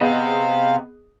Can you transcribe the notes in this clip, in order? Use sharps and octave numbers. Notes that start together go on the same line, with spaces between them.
C3 B3 G#4 D#5 F5